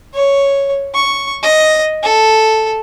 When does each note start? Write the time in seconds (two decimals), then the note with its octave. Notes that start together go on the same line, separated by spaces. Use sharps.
0.13 C#5
0.95 C#6
1.43 D#5
2.03 A4